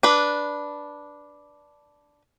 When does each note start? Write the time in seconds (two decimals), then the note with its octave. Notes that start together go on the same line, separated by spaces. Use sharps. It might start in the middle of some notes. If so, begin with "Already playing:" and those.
0.03 D4 B4